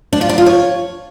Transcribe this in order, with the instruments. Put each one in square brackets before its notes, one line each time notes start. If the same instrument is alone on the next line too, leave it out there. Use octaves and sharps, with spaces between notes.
[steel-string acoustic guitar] D4
F4
D4
F4
C#5